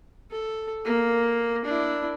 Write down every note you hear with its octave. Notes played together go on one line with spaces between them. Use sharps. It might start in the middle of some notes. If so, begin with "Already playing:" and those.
A4
A#3
D4 E4